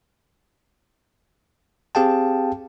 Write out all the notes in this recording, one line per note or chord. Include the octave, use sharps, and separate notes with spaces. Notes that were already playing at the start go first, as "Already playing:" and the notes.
C4 G4 G#4 F5 G5 A5